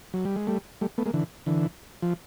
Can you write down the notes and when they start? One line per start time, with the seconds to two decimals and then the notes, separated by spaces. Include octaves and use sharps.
0.14 F#3
0.25 G3
0.36 G#3
0.47 G3 A3
0.81 G3 A3
0.98 A3 B3
1.06 G#3 A#3
1.14 D3 E3
1.46 D3 E3
2.02 F3